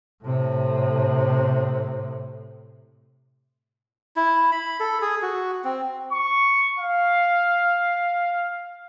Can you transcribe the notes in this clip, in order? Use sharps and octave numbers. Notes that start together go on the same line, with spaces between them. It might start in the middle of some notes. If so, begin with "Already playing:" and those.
A2 C3
E4
B5
A4
G#4
F#4
C4
C#6
F5